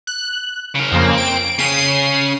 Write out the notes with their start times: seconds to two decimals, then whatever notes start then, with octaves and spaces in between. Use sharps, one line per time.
0.07 F#6
0.75 C#3 A#4
0.92 F2 C#3 A#3 C4
1.17 D7
1.59 C#3 C#4 C7 D#7